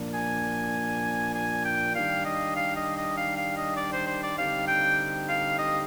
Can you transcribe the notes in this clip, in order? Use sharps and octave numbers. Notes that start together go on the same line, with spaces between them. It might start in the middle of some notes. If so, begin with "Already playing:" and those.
Already playing: A#2 F3 A#3 D4
G#5
G#5
G5
D#3 G3 D4 G4 F5
D#5
F5
D#5
D#5
F5
F5
D#5
D5
C5
C5
D5
D3 G3 C4 D#4 G4 F5
G5
F5
D#5